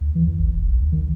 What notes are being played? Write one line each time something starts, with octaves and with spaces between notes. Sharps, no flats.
D2
E3
E2
A1
E1
B1
D2
D#3